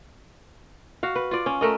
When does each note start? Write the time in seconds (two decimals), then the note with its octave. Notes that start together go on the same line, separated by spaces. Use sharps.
1.03 F#4 F5
1.16 B4
1.31 F4 D5
1.46 C#4
1.61 A3 A#4 D#5